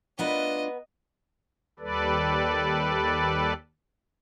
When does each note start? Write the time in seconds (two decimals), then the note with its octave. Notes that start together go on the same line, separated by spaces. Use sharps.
0.19 D2 B3 D4 F4 A#4 B4 D#5
1.79 D#2 G3 A4 B4 D5